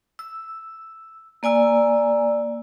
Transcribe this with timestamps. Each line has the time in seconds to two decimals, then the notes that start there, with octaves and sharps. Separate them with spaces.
0.19 E6
1.43 A#3 D5 G#5 E6